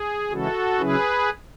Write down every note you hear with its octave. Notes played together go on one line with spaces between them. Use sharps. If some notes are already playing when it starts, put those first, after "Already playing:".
Already playing: G#4
C#3 E3 G#3 C#4 E4 F#4 A4
C#3 F#3 C#4 E4 G#4 B4